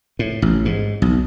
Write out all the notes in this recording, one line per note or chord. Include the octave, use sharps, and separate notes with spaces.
A2
A1
G#2
B1